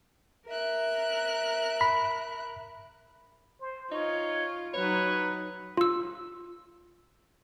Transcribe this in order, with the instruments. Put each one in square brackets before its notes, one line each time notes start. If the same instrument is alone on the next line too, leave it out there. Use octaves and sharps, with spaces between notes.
[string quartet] A#4 E5 F#6
[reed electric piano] B5
[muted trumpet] C5
[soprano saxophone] D#4 [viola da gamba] F4 [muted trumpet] C#5
[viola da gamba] F#3 D#4 [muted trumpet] B4 [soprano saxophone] C#5
[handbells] F4 E6